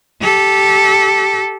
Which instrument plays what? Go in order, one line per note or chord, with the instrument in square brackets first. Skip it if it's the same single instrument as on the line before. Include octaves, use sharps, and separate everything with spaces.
[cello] G4 A4